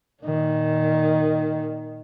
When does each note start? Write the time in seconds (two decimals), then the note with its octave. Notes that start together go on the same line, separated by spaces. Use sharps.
0.23 A#2 D#3